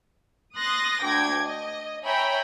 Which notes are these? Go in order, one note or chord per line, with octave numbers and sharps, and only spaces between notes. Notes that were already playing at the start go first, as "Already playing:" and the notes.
C6 D#6 F#6 A6 A#6
D2 G5 D6 G#6
D#5
C#5 E5 G5 G#5 A#5 B5